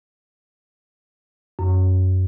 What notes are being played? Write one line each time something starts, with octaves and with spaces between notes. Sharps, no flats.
F#2